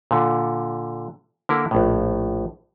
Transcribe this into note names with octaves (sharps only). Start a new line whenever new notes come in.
A#2 D3
D3 A#3 E4 A#4
A#1 A2